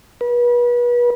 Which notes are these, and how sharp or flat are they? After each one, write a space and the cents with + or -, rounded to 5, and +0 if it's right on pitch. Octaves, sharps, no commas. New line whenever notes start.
B4 -35